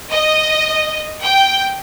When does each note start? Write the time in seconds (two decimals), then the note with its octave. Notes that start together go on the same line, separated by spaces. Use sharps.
0.11 D#5
1.23 G5